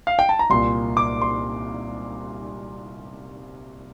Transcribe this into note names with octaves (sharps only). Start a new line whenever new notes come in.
F5
G5
A5
A#5
C2 A#2 C6
D6
C6